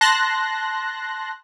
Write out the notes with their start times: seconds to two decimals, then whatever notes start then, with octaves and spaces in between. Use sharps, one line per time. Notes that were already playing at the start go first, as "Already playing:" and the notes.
0.01 A5 C6 F#6 A#6